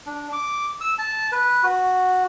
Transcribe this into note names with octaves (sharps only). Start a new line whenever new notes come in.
D4
D6
E6
A5
B4
F#4